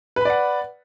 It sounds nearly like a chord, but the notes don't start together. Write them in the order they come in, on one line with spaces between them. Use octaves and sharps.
B4 B5 D5 F#5